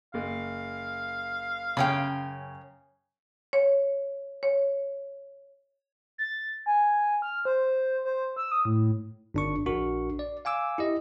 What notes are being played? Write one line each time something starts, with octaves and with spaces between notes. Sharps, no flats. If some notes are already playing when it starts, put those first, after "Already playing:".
F#1 F5
F#2 C#3 C#4 G5
C#5
C#5
A6
G#5
F6
C5
C5
E6
D#6
A2
G1 D4 C#6
A#1 D4 F#4 A#4 C#6
D5
F5 G#5 D6 E6
E4 G4 D#5